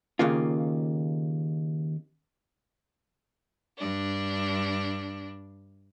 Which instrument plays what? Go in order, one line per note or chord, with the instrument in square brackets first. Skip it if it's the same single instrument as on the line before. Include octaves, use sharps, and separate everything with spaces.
[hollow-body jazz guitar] D#2 C#3 A#3 F4
[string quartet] G2 D4